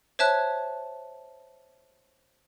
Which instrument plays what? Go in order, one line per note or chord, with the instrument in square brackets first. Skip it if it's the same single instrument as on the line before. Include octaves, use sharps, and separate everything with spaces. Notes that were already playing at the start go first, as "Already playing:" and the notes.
[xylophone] C5 C#5 E5 A5 F#6